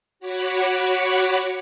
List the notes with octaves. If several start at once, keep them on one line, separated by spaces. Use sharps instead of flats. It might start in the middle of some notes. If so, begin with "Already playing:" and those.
F#4 C#5 F#5 B5 D6